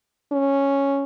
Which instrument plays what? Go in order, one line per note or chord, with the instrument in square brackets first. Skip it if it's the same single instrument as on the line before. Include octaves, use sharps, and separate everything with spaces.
[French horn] C#4